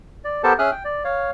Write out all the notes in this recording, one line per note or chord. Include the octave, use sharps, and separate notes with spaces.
D5
B3 G4 A4 A#4 C5 A5
C#4 G#4 E5 D#6 F6 F#6
G5
D5
C#5 F5